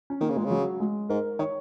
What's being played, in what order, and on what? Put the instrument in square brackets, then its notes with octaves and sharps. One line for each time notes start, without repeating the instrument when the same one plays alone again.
[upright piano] C#4
[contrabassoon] D#3 [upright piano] A#3
[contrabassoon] C#3
[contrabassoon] A#2 [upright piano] G#3
[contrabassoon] C#3
[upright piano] F#3
G#3
[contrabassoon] G#2 [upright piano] A#4
[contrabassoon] D#3 [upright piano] C#5